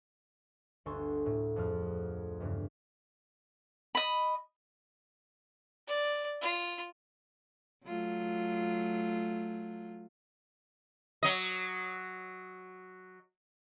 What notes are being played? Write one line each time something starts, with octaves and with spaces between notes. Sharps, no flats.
G1 D2 A4 G#5 C6 C#6
A2
F2 F3 G#4 F6
E2 G2 C#3
D#5 B5
D5
F4
F#3 A3 F4
F#3 D#5